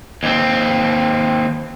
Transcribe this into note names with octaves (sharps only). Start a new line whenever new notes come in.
D#2 C4